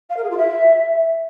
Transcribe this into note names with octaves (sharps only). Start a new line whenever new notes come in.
F5
A#4
G#4
F4
E5